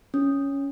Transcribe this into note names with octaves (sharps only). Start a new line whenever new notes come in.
C#4